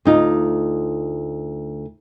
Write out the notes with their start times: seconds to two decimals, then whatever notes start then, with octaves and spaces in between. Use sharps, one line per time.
0.05 D2 D#4 F4